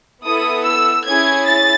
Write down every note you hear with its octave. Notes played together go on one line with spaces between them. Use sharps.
B3 E4 A4 D#6
E6
C#4 E4 G#4 G#6
A6